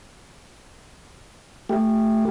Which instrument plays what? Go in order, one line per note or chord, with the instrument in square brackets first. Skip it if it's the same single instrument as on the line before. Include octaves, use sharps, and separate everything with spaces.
[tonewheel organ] A3 G4